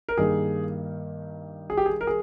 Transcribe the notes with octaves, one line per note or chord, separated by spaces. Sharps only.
A#4
G2 D#3 A#3 D#4 G#4
G#4
G4
G#4
A#4
G#4